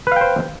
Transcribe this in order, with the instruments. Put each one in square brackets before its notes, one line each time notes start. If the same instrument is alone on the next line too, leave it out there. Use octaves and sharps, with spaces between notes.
[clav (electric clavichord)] B4
F5
G5
C5